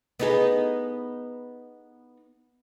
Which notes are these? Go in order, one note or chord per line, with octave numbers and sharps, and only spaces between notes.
B3 D#4 G#4